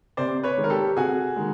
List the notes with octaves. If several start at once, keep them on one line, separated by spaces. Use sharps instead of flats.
C3 C5 D5
B4 C#5
D#3 G#3
A#4
G4 A4
C3 F#4 G#4
D#3 G#3